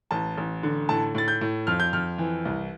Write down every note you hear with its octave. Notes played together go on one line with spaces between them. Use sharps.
A1 A5
A1
D3
A2 A5
A2 A6
G6
A2
F2 F6
G6
F2 F6
E3
C2